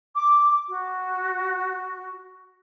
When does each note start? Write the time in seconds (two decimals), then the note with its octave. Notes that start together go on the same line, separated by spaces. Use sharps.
0.16 D6
0.70 F#4